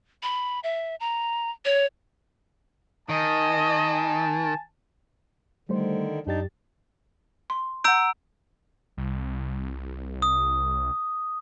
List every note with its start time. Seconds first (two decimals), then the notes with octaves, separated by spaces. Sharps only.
0.23 B5
0.64 E5
1.00 A#5
1.65 C#5
3.09 D#3 D#5 G#5 A5
5.69 D3 D#3 G3 A3 C5
6.27 F#2 D4 D#4 G4 A6
7.50 C6
7.84 F#5 A#5 E6 G6 D7
8.97 C2
10.22 D#6